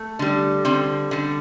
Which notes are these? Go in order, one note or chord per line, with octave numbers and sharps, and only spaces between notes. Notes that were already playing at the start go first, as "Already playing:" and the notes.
Already playing: A3
D3 G3
D3 G3 C4
D3 G3